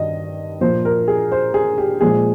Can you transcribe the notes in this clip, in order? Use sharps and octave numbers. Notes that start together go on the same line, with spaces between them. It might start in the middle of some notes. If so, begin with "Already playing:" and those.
Already playing: G2 D#3 D#5
A#2 F3 A#3 C5
A#4
G#4
C5
G#4
G4
A#2 F3 G#3 G#4